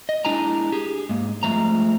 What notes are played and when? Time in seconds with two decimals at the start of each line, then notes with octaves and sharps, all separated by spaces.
0.09 D#5
0.25 G#3 A#3 D4 E4 G#5 A#5
0.72 G4 G#4
1.09 G#2 A#3
1.43 G2 F3 G#3 A3 C4 A#5